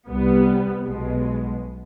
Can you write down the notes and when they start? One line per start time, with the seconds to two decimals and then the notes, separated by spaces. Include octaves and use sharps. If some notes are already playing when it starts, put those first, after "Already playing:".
0.09 C2 C3 G3 B3
0.85 B1 B2 G#3